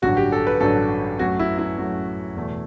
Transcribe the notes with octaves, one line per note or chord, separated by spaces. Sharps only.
A1 G2 D3 F#3 F#4
G4
A4
B4
A1 G2 D3 F#3 A4
F#2 F#3 A3 F#4
E4
E4
F#2 F#3 A3
E2 B2 A3